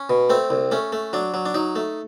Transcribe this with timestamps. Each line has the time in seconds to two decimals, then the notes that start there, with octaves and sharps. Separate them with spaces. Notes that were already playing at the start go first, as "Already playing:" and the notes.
Already playing: C#4
0.10 B2
0.30 A3 C4
0.50 C2
0.71 A3 C#4
0.93 A3
1.13 F#3 D4
1.34 F#3
1.45 D4
1.54 F#3 D#4
1.76 A3